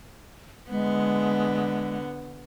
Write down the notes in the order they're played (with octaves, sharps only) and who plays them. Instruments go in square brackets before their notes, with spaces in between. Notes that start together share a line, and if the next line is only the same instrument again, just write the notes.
[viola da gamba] D3 B3 [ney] G#3